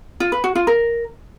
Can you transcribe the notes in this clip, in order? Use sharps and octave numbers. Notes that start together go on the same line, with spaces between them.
F4
B4
F#4
F4
A#4